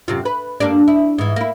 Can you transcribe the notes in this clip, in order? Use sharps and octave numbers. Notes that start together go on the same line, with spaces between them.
F#2 C3 F4
B4
G2 A#3 D4
E4
G#2 E3
A#3 E4